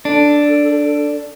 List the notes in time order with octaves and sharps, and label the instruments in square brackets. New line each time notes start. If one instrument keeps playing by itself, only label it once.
[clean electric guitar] D4 [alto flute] A4